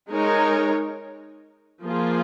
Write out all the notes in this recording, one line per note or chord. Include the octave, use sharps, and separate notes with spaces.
G#3 D#4 A#4 C#5
F3 A#3 F4 G#4